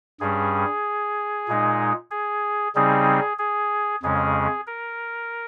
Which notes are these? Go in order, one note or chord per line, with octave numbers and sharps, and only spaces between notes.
G2 G3 C#4 G#4
A#2 G#3 D#4
G#4
C#3 G3 C4 D#4 G#4
G#4
F2 C#3 G#3 C#4 G#4
A#4